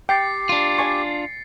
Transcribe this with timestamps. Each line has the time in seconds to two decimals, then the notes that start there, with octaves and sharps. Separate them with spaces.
0.09 G4 G5 A6 C7 C#7
0.49 D4 F4
0.78 D5 G#5 C#6